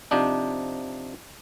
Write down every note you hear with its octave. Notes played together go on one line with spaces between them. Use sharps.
C3 F3 D4 D#4